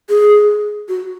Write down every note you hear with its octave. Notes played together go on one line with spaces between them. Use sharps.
G#4
F#4